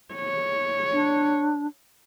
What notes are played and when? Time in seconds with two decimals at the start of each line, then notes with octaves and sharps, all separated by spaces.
0.14 C#5
0.93 D4